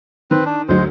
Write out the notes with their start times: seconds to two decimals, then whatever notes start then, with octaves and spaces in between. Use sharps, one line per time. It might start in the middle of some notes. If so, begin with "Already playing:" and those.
0.31 D#3 C4 B4
0.46 D4
0.69 D2 F#3 G#3 C5